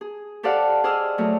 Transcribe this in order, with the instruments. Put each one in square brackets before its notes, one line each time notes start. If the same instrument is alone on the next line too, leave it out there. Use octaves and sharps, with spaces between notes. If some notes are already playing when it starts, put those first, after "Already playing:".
[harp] G#4
G4 A4 C5 D5 F5 F#5
G#4 C5 D5 D#5 E6 F6
F#3 A3